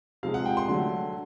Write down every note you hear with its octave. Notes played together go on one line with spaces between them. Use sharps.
C3 F3 G#3 F5
F#5
G5
C6
D3 F#3 A3